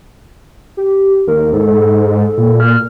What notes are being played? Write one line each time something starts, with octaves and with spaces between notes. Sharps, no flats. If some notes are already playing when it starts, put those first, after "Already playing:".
G4
D#2 A#4
G#2 A4
A#2
F6